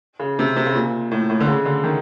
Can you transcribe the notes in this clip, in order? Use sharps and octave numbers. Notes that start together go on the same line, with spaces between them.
C#3
C3
C3
C#3
A#2
A2
A2
D3
C#3
D3
D#3